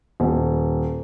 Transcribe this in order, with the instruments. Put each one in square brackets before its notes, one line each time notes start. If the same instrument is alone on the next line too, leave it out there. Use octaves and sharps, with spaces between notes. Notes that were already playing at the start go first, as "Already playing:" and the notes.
[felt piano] D#1